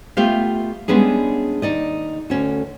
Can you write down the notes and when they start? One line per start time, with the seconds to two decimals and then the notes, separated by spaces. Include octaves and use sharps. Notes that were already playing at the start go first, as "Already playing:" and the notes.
0.17 A3 B3 F4 G4 E5 F5
0.88 G3 G#3 B3 C#4 D4 G#4
1.62 D#2 D#4 D5 D#5
2.30 D2 C#4 F#4